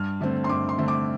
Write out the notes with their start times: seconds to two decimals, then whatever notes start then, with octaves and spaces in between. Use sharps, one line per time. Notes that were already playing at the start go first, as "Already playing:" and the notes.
Already playing: G2 F6
0.21 D3 A3 C4
0.44 C6
0.49 G2 D6
0.69 C6
0.78 D3 A3 C4
0.88 D6